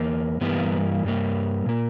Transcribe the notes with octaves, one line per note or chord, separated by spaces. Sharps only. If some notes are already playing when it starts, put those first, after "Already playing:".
Already playing: E2 A#3
G2 E3 G3 A#3 B3
G2 G3 A#3
A#2 A#3